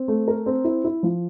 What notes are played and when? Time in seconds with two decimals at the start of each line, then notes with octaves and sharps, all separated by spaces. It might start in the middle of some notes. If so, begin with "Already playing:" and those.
Already playing: C4
0.08 A3
0.28 A#4
0.46 C4
0.64 E4
0.84 E4
1.03 F3